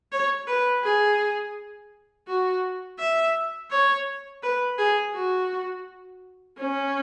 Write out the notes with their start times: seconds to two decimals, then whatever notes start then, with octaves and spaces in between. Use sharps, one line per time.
0.12 C#5
0.47 B4
0.83 G#4
2.27 F#4
2.99 E5
3.71 C#5
4.43 B4
4.78 G#4
5.14 F#4
6.58 C#4